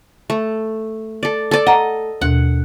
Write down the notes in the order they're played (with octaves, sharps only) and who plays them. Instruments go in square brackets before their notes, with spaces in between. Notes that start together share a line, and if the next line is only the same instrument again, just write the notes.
[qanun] A3
A4 D5
A4 D5
[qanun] D#5 [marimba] F#5 A#5
[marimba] D#2 B2 [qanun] F#5